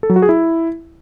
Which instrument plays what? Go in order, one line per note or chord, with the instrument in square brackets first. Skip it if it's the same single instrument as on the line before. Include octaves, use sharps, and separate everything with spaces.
[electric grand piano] A4
F#3
F#4
G#4
E4